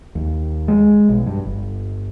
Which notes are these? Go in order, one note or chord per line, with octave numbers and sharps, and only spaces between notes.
D#2
G#3
B1
G2
G1